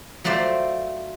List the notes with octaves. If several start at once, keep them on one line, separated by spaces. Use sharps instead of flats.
F#3 A3 F4 C5 D5 E5